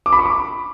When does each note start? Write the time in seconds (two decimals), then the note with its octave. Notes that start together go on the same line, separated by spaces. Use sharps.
0.06 D6
0.12 B5
0.19 C#6
0.26 D6